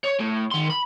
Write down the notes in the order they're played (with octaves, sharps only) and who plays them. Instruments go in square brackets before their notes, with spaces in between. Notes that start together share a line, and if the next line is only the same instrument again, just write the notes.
[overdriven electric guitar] C#5
A2
D#3 C6
B5